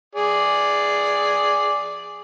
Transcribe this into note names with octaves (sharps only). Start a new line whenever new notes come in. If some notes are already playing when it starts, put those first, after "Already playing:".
G#4 D5